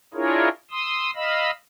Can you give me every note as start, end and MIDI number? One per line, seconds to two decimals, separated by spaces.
0.14 0.49 62
0.14 0.49 64
0.14 0.49 65
0.14 0.49 68
0.14 0.49 70
0.14 0.49 73
0.71 1.11 84
0.71 1.11 87
0.71 1.11 88
1.15 1.51 75
1.15 1.51 77
1.15 1.51 83
1.15 1.51 88